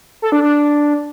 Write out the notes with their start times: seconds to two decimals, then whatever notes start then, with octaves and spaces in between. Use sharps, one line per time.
0.22 A4
0.32 D4
0.42 D4